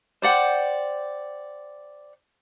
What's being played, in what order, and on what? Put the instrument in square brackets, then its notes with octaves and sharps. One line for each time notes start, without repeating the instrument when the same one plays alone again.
[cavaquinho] C5 D5 F#5 G5